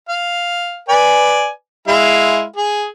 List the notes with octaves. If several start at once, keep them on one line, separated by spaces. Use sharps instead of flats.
F5
B4 D5 G#5
G#3 E4 F5
G#4